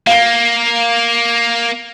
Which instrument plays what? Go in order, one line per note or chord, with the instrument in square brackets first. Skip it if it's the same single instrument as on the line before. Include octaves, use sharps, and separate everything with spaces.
[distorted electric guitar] A#3 [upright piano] F5 G7